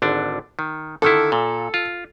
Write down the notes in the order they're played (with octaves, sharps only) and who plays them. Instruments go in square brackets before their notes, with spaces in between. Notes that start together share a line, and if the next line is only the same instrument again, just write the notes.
[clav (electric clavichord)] G#1 D3 D4
D#3
[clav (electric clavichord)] D3 D#3 E4 [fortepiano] A4
[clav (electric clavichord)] A#2
F4